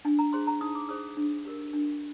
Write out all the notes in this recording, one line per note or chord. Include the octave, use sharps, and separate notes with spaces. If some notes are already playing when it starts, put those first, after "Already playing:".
D4 G#5
A#5
G#4 C5 C6
A#5
D#4 D#6
D6
G#4 C5 D#6
D4
G4 A#4
D4